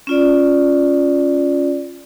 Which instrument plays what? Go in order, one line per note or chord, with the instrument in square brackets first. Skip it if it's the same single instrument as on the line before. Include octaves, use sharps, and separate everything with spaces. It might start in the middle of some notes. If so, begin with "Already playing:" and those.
[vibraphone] C#4 F4 D5